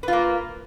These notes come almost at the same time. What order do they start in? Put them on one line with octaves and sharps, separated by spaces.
B4 F4 A#3